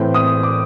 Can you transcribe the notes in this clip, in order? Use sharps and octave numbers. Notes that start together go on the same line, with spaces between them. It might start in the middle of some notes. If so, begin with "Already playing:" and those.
Already playing: A2 E3 A3 C4
D#6
D6